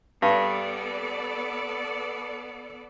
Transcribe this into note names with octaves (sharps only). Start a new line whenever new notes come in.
G2 B3 A4 D5